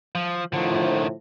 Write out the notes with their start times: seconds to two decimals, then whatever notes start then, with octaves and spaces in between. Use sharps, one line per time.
0.15 F3
0.53 A2 D3 D#3 F3